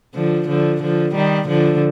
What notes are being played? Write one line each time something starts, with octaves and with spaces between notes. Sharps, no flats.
D3 F3
D3 F3
D3 F3
D#3 G3
D3 F3